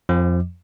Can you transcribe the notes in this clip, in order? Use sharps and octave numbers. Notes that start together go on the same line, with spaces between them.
F2 F3